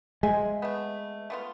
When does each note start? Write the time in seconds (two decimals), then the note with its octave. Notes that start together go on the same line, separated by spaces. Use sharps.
0.23 G#3 C5 E5 G#5
0.62 A3 B3
1.30 A3 B3 F4